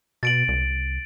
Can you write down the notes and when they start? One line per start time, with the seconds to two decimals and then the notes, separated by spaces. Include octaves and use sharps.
0.23 B2 A6 D7 F#7
0.48 C2